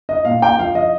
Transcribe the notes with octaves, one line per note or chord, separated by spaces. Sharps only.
D#5
A#2 F5
G5
F3 F5
D#5